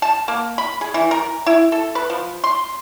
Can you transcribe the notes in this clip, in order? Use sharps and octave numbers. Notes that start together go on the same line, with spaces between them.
A5
A#3
B5
G#4
E3
A#4
E4
A4
B4
F3
C6